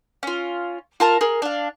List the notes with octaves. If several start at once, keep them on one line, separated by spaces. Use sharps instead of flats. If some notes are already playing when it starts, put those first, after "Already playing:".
C#4 F4
F4 A#4 A5 A#5
G#4 A#4
D4 F5